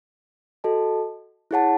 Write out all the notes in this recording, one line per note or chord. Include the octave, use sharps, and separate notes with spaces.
F#4 A4 D#5 A5
E4 G#4 C#5 F#5 A5